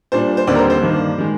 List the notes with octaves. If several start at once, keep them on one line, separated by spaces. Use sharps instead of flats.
A#2 G3 D4 C5
C5
D#2 D3 G3 C4 D5
A#4
C5
C5
G2 D#3 A#3 D4
D#3 G#3